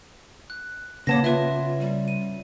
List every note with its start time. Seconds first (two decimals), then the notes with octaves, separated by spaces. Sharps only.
0.50 F#6
1.07 C#3 A#3 B3 C#5 A5 A#6
1.24 F4 B4 E5
1.80 G3
2.08 D#7